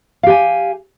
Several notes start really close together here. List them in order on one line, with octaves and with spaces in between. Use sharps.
F5 G4 G#5